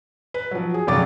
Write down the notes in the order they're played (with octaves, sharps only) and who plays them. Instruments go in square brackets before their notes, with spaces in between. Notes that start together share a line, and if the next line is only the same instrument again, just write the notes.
[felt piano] B4
F3 F#3
G#4
F1 C#3 F#3 D6 A6